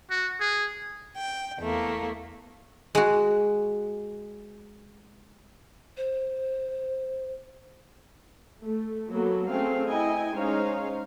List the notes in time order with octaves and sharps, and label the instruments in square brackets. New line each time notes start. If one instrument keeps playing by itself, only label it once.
[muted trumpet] F#4
G#4
[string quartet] G5
E2 A3 A#3
[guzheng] G#3 F#4
[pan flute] C5
[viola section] A3
F#3 A#3 B3 A4
A3 C4 C#4 G#4 A4 F5
E4 D#5 G5 G#5
G#3 C#4 D#4 C5 C#5 F5